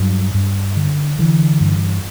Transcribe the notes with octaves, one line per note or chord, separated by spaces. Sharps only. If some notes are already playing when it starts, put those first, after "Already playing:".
Already playing: G2 F#3
G2
D3
D3 E3
G2